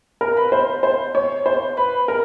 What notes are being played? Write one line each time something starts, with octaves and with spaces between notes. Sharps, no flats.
A#4
B4
C5
C5
C#5
C5
B4
A#4